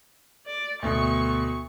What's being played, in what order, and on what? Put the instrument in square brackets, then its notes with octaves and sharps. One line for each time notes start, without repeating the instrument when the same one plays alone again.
[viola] D5
[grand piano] D2 B2 [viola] C#6